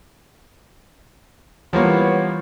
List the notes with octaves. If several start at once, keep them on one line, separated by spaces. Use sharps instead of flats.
E3 F3 G3 A#3 B3 C#5